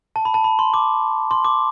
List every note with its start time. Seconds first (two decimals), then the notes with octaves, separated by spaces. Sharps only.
0.16 A5
0.25 B5
0.34 A5
0.44 B5
0.59 C6
0.74 D6
1.31 C6
1.45 D6